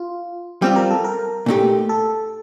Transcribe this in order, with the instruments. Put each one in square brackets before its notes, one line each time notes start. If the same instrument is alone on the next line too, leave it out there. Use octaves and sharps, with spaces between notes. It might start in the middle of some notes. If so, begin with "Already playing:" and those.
Already playing: [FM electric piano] F4
[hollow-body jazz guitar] G3 C4 F4 [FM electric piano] G4
[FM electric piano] A#4
A4
A#4
[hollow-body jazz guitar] A#2 A3 D#4 G4
[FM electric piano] A4